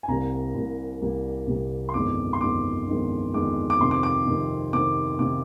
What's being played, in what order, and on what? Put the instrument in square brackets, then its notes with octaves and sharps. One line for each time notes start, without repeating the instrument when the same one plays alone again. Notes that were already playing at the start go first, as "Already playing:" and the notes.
[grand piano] G#5
C2 C3 G3 A#3 A#5
C2 C3 G3 A#3
C2 C3 G3 A#3
C2 C3 G3 A#3
C6
G1 F2 D#3 G#3 D6
C6
G1 F2 D#3 G#3 D6
G1 F2 D#3 G#3
G1 F2 D#3 G#3 D6
D6
F2 C3 D#3 C6
D6
D6
F2 C3 D#3
F2 C3 D#3 D6
C3 D#3 D6